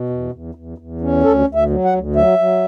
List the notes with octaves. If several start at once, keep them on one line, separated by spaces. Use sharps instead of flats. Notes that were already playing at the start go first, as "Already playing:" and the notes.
Already playing: B2
E2
E2
E2
E2
C#4
D2 A4
D2
E5
F#3
F#5
D2
F#3 E5
F#3